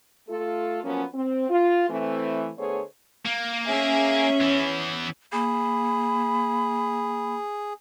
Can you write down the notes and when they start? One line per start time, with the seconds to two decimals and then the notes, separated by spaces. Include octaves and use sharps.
0.29 A3 F4 A4
0.83 F3 F#3 A#3 B3 C#4
1.14 C4
1.49 F4
1.90 E3 A3 C4
2.58 D3 A3 B3 G#4 C5 C#5
3.25 A#3
3.68 C#4 G#4 E5
4.41 E3 B3
5.33 A#3 G#4 B5